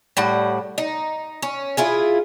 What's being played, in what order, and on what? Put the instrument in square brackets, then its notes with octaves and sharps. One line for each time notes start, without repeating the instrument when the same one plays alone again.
[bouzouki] A2 G3 F#5
D#4
C#4
E4 F4 G#4